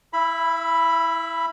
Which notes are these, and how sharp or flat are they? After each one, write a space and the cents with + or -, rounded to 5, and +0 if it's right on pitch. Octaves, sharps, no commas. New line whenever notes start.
E4 -5 E5 +30 B5 +0